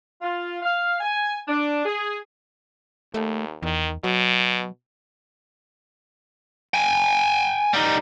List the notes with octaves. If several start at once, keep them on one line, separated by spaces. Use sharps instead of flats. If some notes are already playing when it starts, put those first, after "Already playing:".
F4
F5
G#5
D4
G#4
D#2 A3
E2 D#3
B2 F#3
G5 G#5
G3 D#4